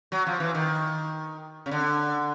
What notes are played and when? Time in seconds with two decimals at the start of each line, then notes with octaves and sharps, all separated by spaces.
0.12 F#3
0.27 F3
0.40 E3
0.55 D#3
1.66 C#3
1.71 D3